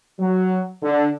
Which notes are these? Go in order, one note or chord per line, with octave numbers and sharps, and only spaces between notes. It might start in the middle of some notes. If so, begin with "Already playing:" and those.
F#3
D3